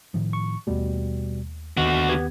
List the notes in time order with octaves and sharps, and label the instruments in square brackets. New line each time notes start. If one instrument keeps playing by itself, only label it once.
[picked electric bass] A2 D#3 F3
[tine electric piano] C#6
[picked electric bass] D#2 A3 [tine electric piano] B2 G3
[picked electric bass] D#2 D#3 [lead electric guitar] D3 F#4 [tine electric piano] B3 D#5
[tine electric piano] B3 G4 G#6